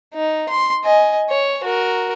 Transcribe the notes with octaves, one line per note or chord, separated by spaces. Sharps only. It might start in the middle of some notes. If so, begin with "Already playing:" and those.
D#4
C6
D#5 G#5
C#5
F#4 A#4